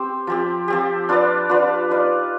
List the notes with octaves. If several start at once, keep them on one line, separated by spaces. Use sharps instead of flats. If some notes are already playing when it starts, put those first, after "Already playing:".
Already playing: C4 G4 C5
F3 C4 G4
F3 C4 G4
D4 F4 B4 D5
D4 F4 B4 D5
D#4 B4 D5 F5